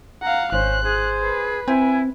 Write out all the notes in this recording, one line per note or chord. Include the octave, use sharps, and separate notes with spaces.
F5 F#5 A#5
G#1 C#4 C5 F#6
G#4 C5
B4
C4 E4 G#5